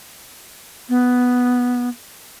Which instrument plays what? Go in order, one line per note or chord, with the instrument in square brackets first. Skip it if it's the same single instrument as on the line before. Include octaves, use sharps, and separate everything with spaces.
[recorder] B3